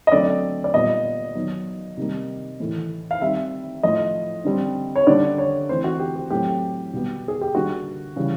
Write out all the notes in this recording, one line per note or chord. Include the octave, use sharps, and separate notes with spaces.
D#5
D3 F#3 A3 C4 D5
D5
A#2 G3 B3 D#5
D#3 F#3 B3
C3 D#3 G3 A#3
A2 E3 A3
F5
D#3 G3 C4 E5
A2 F3 A3 D#5
D3 G3 C4
C#5
D3 G3 A#3 D5
C#5
E3 A3 C4 C5
F#4
G4
G4
A2 F#3 A3 C4 G4
B2 G3 B3
G#4
G4
D3 G3 A#3 F#4
C#3 E3 G3